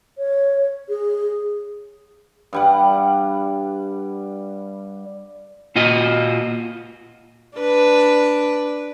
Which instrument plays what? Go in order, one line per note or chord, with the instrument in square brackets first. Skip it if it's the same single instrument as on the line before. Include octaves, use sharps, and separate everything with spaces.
[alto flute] C#5
G#4
[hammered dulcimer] G2 G3 F#5
[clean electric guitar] A#2 F4 F#4 D#5
[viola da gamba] D4 B4